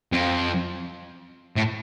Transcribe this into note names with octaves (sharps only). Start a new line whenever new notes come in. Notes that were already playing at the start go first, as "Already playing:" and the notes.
F2
A2